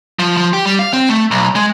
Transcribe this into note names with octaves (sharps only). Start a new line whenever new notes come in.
F3
F3
G4
G3
F5
C4
A3
B1
G#3